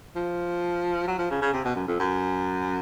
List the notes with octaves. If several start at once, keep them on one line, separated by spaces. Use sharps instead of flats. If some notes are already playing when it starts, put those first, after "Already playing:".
F3
F#3
F3
C#3
C#3
C3
B2
F#2
F2
F#2